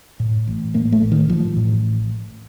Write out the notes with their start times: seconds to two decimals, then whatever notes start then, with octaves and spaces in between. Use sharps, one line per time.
0.20 A2
0.47 A1
0.74 A2 A#3
0.92 A3
1.03 A1
1.12 D#3
1.29 A1 F3
1.57 A2